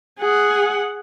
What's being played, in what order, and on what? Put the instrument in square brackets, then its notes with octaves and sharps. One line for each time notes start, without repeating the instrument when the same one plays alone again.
[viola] G#4 F#5